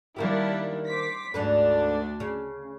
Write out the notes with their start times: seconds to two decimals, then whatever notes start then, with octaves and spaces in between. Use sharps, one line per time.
0.16 D#3 G3 A#3 D4 E4 G4
0.87 C5 D6 B6
1.34 D2 G#2 D3 D4 B4
2.20 C#3